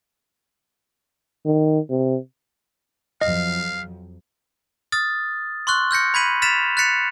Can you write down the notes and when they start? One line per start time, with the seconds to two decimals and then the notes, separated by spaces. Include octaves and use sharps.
1.46 D#3
1.90 C3
3.21 F2 F3 F#3 D#5 F5
4.92 D#6 F6 A6
5.67 C6 C#6 F6 F#6
5.91 F6 G6 A#6 C#7
6.14 B5 G#6 B6 D#7 F#7
6.42 F6 A6 B6 E7 F7
6.77 F#6 A6 B6 C#7 F7